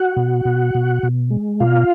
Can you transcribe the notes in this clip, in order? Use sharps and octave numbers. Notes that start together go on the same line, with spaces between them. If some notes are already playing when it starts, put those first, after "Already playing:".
Already playing: F#4 F#5
B2
B2
B2
B2
G#3
B2 F4 F5